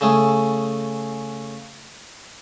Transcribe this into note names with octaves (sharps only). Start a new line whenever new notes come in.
C#3 A3 G#4